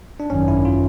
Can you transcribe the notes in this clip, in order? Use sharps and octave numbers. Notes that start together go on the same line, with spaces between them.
D4
G#1 F#2 D#3 C#4
E4
F4